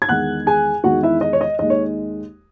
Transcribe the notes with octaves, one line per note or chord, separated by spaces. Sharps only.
G#6
E2 D#3 G#3 D#4 F#5 F#6
G#4 G#5
E2 D#3 G#3 F#4 F#5
E4 E5
D#5
C#5
D#5
D#2 D#3 G#3 D#4 D#5
C#5